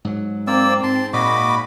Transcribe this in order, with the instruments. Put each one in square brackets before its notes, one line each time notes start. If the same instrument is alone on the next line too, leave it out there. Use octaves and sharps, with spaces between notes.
[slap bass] G#2 F#3
[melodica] A#3 D5 E6 [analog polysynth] C4
[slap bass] G#2 [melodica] A5 C6
[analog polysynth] A#2 B5 [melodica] F#4 D#5 D6